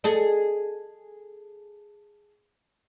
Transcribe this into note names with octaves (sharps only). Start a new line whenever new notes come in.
G#4 A4 D#5